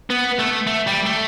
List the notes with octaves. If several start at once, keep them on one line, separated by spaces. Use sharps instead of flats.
B3
A3
A3
G3
A3